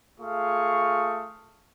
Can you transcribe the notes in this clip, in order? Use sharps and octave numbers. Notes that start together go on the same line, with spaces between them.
A3 F4 G#4 F5 C#6 D#6